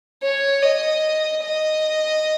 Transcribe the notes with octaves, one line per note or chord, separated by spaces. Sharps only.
C#5
D#5
D#5